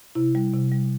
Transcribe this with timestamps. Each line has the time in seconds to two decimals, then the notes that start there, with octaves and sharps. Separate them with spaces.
0.15 C3 E4
0.35 G3
0.53 C3
0.72 G3